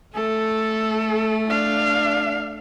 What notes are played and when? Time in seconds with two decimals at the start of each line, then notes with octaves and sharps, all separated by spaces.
0.15 A3 A4
1.48 D4 F5